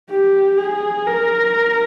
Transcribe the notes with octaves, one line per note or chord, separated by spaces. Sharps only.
G4
G#4
A#4